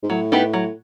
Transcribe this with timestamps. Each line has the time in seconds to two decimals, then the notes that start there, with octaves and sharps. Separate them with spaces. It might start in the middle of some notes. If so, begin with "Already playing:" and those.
0.03 G#2
0.10 A2 F#3
0.32 B3 D#4 G4 B4
0.53 F#3